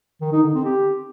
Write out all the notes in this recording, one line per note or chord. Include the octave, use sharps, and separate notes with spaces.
D#3
D#4
D3
C4
G4